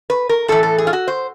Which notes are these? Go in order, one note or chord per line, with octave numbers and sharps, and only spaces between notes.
B4
A#4
A2 E3 A4
A4
G#4
F4
F#4
C5